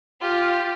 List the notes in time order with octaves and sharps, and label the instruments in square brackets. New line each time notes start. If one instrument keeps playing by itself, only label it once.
[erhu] F4 [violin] G4